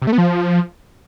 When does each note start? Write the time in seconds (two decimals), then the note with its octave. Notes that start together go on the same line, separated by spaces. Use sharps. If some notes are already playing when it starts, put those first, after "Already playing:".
0.02 C3
0.07 A3
0.13 B3
0.18 F3